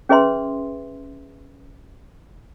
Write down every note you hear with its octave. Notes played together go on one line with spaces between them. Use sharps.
C#4 G#4 B4 E5 C6